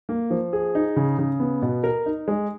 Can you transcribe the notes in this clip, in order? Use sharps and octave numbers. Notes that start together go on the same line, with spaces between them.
A#3
F3
G#4
D#4
C#3
C#3
B3
B2
A#4
D#4
G#3